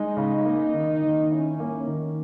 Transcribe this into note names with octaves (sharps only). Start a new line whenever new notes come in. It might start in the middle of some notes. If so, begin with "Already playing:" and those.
Already playing: G#3 D#4
C#3
A#3
D#3
D#3
C#4 E4
A#3
D#3